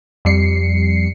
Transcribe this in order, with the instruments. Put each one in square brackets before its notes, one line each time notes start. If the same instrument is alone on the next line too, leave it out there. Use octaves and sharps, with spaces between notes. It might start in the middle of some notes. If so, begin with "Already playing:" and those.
[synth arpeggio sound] F2 G3 C7 C#7